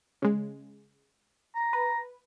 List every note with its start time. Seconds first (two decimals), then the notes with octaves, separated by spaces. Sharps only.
0.22 C#3 G#3
1.55 A#5
1.73 B4